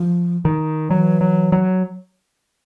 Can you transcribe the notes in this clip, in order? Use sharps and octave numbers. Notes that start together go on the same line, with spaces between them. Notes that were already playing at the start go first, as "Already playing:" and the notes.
Already playing: F3
D#3
E3 F#3
F#3
F#3